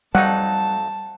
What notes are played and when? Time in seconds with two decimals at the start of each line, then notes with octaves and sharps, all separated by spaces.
0.15 F2 F#3 G3 D#4 F#5 A5